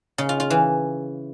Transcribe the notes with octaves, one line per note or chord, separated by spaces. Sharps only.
C#3
F4
F4
E3